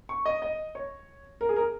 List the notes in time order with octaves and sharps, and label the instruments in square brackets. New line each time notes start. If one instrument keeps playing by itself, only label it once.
[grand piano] C#6
D#5
D#5
C#5
A#4
G#4
A#4